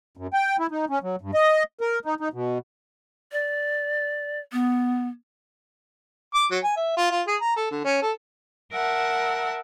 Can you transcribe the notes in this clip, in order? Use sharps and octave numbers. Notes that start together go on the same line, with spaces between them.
F#2
G5
E4
D#4
C#4
F#3
G2
D#5
A#4
D#4
D#4
B2
D5
B3
D6
F#3
G#5
E5
F4
F4
G#4
A#5
A4
D3
C#4
A4
A#4 E5 F#5 A5